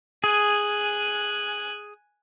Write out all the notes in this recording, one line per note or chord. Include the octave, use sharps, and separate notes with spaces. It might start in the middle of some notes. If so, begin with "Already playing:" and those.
G#4 G#5 F#6